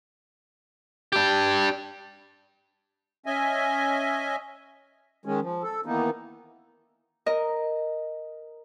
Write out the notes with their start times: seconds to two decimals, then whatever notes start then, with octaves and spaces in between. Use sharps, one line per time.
1.12 D4 G4
3.26 C#4 D#5 E5 G#5
5.25 D#3 G#3 C#4
5.42 F3
5.63 A4
5.86 D#3 E3 A#3 B3 D#4
7.26 A#4 D#5